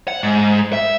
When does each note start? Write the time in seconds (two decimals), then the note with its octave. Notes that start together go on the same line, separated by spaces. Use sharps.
0.08 F#5
0.23 G#2
0.73 E5